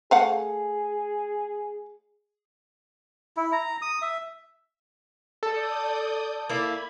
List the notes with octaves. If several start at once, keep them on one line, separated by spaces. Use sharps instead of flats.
A3 G#4 F5 F#5
E4
A#5
D#6
E5
A4 D5 D#6 G6
A#3 E4 D5 B5 G#6